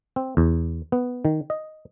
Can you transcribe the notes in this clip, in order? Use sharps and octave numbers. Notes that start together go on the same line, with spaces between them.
C4
E2
B3
D#3
D#5